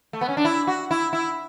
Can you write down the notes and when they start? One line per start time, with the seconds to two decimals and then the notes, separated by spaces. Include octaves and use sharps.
0.13 A3
0.21 B3
0.29 C#4
0.37 D4
0.45 E4
0.67 F#4
0.91 E4
1.13 E4